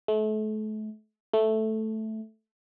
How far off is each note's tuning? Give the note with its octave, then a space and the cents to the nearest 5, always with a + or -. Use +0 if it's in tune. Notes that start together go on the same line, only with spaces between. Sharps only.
A3 -35
A3 -5